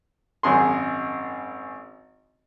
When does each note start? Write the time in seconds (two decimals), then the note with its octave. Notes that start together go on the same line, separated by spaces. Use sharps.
0.43 G#1 F#2 G#4 C6